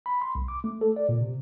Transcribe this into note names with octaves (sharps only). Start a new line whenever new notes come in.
B5
C6
C2
D6
A3
A4
D5
A#2
C3